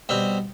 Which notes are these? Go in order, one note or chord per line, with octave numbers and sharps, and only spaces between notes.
B2 G3 C4